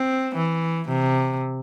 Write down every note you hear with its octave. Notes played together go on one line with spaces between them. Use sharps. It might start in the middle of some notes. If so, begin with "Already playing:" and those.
Already playing: C4
E3
C3